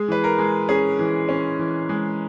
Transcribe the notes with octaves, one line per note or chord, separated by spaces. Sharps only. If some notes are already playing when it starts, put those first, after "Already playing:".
Already playing: G#3 G#4
E3 B4
A#4
G#3
C#4 G#4
E3
C#4
E3
G#3